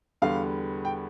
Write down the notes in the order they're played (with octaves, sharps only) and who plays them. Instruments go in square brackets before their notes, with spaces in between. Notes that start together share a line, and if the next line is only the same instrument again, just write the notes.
[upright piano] E2 D3 G3 B3 F5
G5